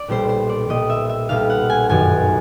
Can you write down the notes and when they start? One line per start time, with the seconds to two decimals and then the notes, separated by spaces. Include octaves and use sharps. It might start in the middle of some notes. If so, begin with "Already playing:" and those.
Already playing: D5
0.08 B1 A#2 G3 C5
0.29 C5
0.49 D5
0.68 B1 A#2 G3 D#5
0.90 E5
1.09 E5
1.29 B1 A#2 G3 F5
1.50 F#5
1.70 G#5
1.89 G1 F#2 D#3 F#3 G#5